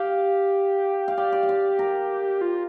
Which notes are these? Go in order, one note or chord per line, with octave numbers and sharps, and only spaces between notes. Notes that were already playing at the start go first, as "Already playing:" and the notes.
Already playing: G4 F5
F5
G4 D5
D5
F5
D5
A#4
F4